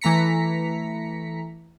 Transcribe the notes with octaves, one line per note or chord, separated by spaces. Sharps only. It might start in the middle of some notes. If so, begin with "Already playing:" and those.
E3 A3 A#5 B6 C#7